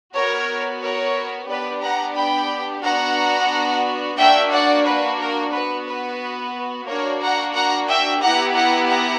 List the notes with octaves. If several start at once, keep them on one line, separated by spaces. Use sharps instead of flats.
B3 F#4 A#4 C#5
A#4 C#5
B3 D4 G4 B4 D5
F#5 A#5
G5 B5
B3 D4 F#4 F#5 A#5
A#3 D4 F#4 E5 G5
D5 F#5
B4
A#4
B3 F#4 B4
B4
A#3 D4 F#4 A#4 C#5
F#5 A#5
F#5 A#5
E5 G5
B3 E4 G4 F#5 A#5
F#5 A#5
F#5 A#5